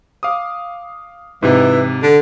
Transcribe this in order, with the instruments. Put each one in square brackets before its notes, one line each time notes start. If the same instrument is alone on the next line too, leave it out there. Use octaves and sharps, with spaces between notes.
[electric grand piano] F5 D6 D#6
[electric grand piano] G#2 C3 [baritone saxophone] E3
[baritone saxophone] D3